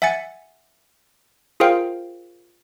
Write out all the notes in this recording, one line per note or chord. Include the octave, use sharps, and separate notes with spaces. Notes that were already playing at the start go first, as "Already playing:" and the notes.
E5 F#5 G#5 A6 C#7
F4 G#4 A#4 C5 F5 G5